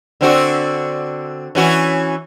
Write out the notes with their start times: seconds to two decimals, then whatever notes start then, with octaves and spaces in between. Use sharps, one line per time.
0.21 D3 C4 F#4
1.55 E3 C#4 F#4